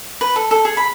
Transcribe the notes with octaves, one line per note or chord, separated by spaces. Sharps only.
B4
A4
A4
G#4
B5